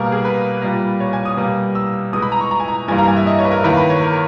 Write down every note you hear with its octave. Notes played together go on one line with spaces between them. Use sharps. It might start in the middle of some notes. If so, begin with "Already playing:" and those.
Already playing: B2 G3 A#3 A#4
G#4
B4
A#2 G3 A#3
C#5
G#5
D#6
B2 G3 A#3
E6
B2 G#3 D#6
B5
A#5
C#6
A#5
G#5
A#5
G2 E3 G3 A#3 G#5
A#5
G#5
E5
D#5
C#5
B4
A#4
E2 D#3 A#3 B4
B4
C#5
A#4